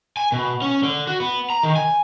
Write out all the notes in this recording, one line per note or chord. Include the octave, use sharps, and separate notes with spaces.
G#5
B2
C#4
D3
F#4
B3
A#5
D#3
G#5